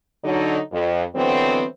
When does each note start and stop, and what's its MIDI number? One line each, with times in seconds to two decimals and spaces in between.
0.24 0.58 50
0.24 0.58 54
0.24 0.58 63
0.72 1.04 41
1.15 1.63 50
1.15 1.63 52
1.15 1.63 54
1.15 1.63 59
1.15 1.63 60